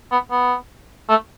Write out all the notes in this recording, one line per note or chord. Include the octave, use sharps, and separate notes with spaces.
B3
B3
A3